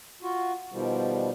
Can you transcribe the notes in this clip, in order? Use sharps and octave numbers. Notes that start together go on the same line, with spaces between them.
F4 F#4
B2 D#3 F3 G3